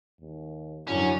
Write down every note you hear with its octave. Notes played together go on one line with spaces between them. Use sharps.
D#2
F#2 D3 F#3 C#4 E4